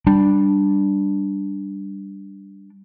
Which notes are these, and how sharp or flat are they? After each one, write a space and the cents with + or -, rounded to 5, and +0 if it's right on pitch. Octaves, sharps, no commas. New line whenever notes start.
G3 +0 D4 +0